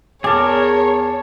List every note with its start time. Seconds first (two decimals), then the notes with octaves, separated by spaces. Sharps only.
0.24 E2 G#4 A#4 C#5 A5 D6